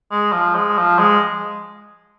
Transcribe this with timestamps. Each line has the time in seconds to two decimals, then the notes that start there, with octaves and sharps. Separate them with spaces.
0.12 G#3
0.32 F3
0.55 G#3
0.78 F3
0.99 G#3